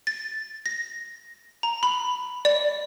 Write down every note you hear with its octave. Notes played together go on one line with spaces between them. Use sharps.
A6
A#6
A#5
B5
D5